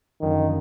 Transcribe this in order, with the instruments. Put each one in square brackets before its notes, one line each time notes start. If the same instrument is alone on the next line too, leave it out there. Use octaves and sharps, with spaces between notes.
[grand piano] F#1 F#2 D3 F3 [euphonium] D#3